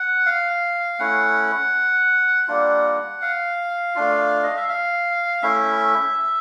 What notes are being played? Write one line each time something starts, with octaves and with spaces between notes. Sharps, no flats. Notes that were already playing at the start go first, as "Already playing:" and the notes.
Already playing: F#5
F5
A3 C#4 E4 F#5
G3 A#3 D4 F4
F5
A3 D4 F4
D#5
E5
F5
A3 C#4 E4 E5